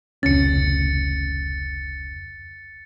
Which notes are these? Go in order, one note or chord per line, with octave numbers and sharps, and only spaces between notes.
F1 C#2 C#4 A6 C#7